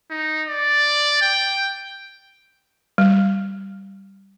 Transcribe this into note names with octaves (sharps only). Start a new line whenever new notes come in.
D#4
D5
G5
G3